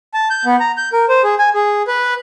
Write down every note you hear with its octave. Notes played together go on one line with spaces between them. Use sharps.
A5
G6
B3
A#5
G6
A#4
C5
G#4
G#5
G#4
B4